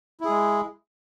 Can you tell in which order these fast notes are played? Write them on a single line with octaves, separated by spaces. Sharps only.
E4 G#4 G#3